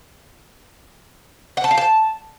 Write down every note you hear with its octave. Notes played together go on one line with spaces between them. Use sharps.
F#5
A5
F5
A5